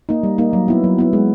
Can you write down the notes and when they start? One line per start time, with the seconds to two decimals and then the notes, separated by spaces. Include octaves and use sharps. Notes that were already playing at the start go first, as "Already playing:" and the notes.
0.09 A#3 D#4
0.23 G3
0.38 A#3 D#4
0.53 F#3
0.68 B3 E4
0.84 F#3
0.99 B3 E4
1.13 G#3